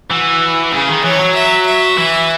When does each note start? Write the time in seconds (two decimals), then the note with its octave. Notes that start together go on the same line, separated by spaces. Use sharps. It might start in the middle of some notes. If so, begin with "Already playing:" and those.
0.10 E3 F#4
0.73 C#3 G#4
0.88 D#3
1.04 E3 C#5
1.19 F#3
1.35 E5
1.66 E5
1.98 E3